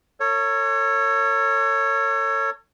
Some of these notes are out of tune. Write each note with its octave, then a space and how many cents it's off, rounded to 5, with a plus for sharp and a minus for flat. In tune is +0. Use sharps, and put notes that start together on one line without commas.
A4 +40 C#5 +0